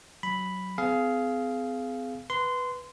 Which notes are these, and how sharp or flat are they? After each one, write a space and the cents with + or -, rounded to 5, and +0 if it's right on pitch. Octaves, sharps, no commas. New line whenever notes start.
F#3 +10 B5 +0
C4 -45 G#4 +20 F5 -10
B4 +0 C6 -20